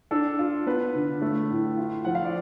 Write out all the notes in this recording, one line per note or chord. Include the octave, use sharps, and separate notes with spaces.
D4 A4
F4
B3 B4
D3
A3
A2
F4
F3 F#5
F5
D5